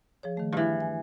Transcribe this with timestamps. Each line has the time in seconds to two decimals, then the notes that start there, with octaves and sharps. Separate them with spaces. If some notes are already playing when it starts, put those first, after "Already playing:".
0.23 F3 G#4 C#5
0.37 D#3 A3
0.53 G2 E3
0.80 G#5